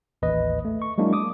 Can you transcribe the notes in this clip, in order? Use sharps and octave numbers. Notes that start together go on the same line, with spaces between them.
A1 D#2 B4 D#5
A3
C#6
F#3 G#3 A#3 D4 E4
D6 D#6